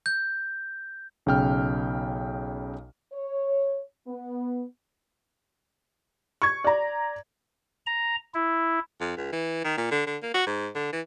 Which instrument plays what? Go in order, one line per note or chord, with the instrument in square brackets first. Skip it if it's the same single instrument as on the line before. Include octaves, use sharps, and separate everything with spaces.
[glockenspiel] G6
[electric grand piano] B1 C#3 G5 F6
[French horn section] C#5
B3
[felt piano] C#6 G#6
D5 A#5
[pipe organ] A#5
E4
[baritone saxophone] F2
C#2
E3
D#3
A#2
D3
D3
A#3
F#4
G#2
D3
E3